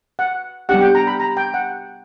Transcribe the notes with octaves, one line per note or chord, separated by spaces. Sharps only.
F#5
G3 B3 D4 G4 F#5
G5
A#5
B5
A#5
G5
F#5